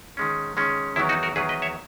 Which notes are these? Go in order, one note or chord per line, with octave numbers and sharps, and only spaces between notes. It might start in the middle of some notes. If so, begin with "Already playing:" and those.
D#3 G#3 C#4
D#3 G#3 C#4
E2 D#3 F#3 E4
D#4 F#4
F#4 A#4
E2 D#3 F#3 G#4 B4
B4 D#5
C#5 E5